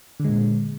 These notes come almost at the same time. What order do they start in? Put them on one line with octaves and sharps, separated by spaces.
D3 G#3 A#2